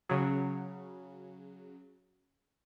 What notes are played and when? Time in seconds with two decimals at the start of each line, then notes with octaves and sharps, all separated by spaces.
0.09 C#3 F#3